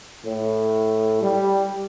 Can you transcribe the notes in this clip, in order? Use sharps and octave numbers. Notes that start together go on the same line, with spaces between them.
A2
G3